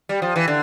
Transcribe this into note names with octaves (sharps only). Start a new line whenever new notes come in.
G3
F3
E3
D3